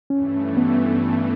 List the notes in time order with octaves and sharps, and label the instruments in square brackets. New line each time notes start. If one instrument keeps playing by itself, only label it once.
[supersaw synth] G2 E3 A3 [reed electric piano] C#4
[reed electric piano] B3